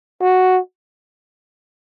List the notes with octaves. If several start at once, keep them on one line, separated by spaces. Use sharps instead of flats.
F#4